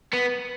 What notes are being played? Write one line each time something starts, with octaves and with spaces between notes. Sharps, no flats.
B3